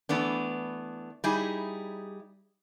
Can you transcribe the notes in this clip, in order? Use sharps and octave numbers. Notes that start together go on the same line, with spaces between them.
E3 A3 B3 D4
G3 D#4 E4 G#4